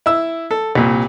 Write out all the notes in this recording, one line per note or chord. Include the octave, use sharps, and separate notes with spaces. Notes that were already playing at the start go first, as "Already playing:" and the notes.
E4 E6
A4
C2 A#2